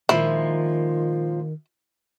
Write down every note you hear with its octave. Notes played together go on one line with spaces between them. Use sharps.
A#2 D#3 F3 G#3 E4